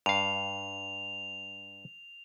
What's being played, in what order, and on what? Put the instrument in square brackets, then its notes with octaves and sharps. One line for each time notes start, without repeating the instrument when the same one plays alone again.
[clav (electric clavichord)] G2 F5 [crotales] F7